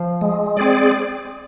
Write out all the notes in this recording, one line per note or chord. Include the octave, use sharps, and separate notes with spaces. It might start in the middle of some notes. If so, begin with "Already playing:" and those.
Already playing: F3
G#3
C4 G#4 D5